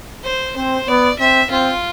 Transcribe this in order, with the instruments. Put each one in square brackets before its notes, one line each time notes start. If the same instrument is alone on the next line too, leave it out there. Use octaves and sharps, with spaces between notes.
[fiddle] C5
[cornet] C4 [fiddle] C5
[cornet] B3 [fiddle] D5
[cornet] C4 [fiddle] E5
[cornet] C4 [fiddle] F4